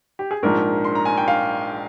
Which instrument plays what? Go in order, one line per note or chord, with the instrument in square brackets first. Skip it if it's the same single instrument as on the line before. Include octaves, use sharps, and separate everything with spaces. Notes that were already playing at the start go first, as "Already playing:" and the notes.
[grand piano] G4
G#4
A#1 G#2 F3 A#4
C6
A#5
G#5
G5
F5